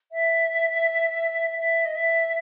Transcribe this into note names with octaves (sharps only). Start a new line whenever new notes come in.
E5
E5
D#5
E5